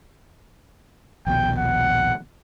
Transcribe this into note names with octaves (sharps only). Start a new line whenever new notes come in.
A#1 D#2 B2 G5
F#5